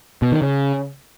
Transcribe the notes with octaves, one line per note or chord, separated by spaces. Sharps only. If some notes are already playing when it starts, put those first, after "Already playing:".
B2
D#3
C#3